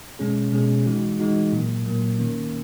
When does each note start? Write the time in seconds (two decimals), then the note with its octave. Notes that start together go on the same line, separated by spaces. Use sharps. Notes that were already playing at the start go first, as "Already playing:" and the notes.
0.19 B2 G#3 C#4 G#4
0.53 B2 G#3 C#4 G#4
0.86 E3 G#3 D#4 F#4
1.19 E3 G#3 D#4 F#4
1.52 A#2 F#3 A#3
1.86 A#2 F#3 A#3
2.19 D#3 A#3 C#4